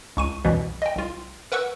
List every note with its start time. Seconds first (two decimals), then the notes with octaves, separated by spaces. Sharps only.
0.17 C#2 C#6 D#7
0.45 C2 F#2 B2 E3
0.82 D#5 G5
0.96 C2 F4
1.52 A#4 B4 F#5 C#6 E6 F#6